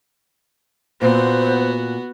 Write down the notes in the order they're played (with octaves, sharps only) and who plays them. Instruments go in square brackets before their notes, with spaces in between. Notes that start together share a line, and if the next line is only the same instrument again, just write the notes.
[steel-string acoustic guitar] A#2 [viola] B3 F#4 [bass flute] C5